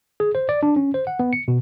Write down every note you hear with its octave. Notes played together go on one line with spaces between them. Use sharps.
G#4
C5
D5
D4
C#4
C5
F#5
B3
C#7
B2